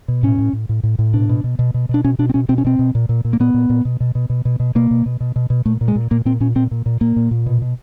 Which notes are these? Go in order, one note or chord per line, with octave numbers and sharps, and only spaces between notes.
B2
A2 C#4
A2
A2
A2
A2
A2
B2 D4
B2
B2
B2
B2
B2 D4
B2 C#4
B2 D4
C4
B2 C#4
B2 C4
C#4
B2 C4
B2
A#2
A#2
A#2
A#3
A#2 B3
A#2
A#2
B2
B2
B2
B2
B2
B2
B2 A#3
B2
B2
B2
B2
B2
A#2 A3
A#2
G#3
A#2
A#2 A#3
A#2 C4
A#2 C#4
A#2 C4
A#2
A#2
A#2 A#3
A#2
A#2
B2
B2